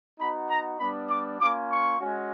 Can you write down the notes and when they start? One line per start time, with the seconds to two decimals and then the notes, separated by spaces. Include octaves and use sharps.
0.19 B3 D#4 F#4 B5
0.49 A#5
0.79 G3 B3 D4 B5
1.09 D6
1.40 A#3 C#4 F4 D6
1.70 C#6
2.00 G#3 C#4 F#4